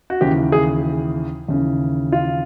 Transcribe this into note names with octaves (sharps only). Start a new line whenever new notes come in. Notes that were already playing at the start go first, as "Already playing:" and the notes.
F#4
D#2 C#3 E3 G4
G#4
D#2 C#3 E3
F4